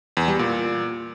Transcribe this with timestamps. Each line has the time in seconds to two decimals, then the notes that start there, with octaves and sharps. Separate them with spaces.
0.17 E2
0.28 G3
0.39 A#2